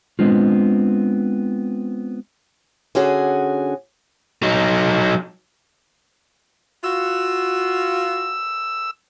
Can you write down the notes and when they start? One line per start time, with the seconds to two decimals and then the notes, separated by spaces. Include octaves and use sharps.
0.19 G#3 B3 C4 D4 F4
2.95 D3 C#4 F#4 G#4
4.43 F#3 D#4
6.84 F4 F#4 E6